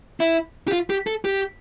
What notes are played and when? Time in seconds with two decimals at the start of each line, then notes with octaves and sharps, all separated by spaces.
0.20 E4
0.68 G4
0.72 F4
0.90 G4
1.07 A4
1.25 G4